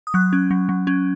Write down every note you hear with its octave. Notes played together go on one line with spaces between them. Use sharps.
D#6
F#3 F#6
C#4
F#3
F#3
C#4